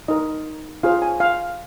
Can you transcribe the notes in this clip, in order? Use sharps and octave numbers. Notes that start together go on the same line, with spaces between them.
D#4 A#4 D#5
F4 G#4 C5 F5
G#5
F5